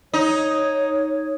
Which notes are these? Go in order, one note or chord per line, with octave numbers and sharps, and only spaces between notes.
D#4 C#5